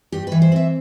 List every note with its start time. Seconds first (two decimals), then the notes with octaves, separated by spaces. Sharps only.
0.12 G2 G4
0.27 E3 B4
0.42 C5
0.52 C4 E5